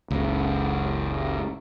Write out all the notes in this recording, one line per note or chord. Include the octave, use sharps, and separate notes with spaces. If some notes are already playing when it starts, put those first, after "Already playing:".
F#1 C#2